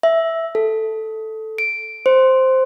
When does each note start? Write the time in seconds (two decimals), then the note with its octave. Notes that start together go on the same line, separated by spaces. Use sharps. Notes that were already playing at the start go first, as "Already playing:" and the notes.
0.03 E5
0.55 A4
1.58 D7
2.06 C5